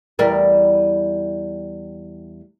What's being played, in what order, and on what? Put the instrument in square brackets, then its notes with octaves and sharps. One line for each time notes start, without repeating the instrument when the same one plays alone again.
[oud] E2 G3 A#4